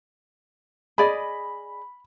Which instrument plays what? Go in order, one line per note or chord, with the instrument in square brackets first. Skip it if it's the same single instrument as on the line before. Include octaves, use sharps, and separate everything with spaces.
[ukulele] G#4 D5 D#5 [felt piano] B5